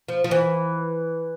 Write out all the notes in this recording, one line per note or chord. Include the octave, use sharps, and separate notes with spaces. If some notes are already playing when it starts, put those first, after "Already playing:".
F3
F3
E3